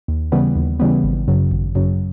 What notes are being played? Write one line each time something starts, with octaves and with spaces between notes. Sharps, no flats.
D#2
C#3 E3 G3 B3
D#2
C#3 E3 G3 B3
G#1
F#2 C#3 F#3
G#1
F#2 C#3 F#3